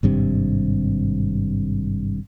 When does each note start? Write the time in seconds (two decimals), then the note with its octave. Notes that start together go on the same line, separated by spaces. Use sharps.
0.03 G#1 G2 C3